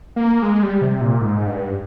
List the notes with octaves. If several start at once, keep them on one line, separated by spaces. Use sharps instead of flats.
A#3
G#3
G3
C3
A#2
G#2
G2